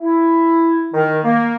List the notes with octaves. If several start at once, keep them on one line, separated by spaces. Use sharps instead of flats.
E4
D#3
A#3